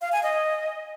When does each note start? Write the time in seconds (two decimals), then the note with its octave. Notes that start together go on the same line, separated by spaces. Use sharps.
0.01 F5
0.12 G#5
0.23 D#5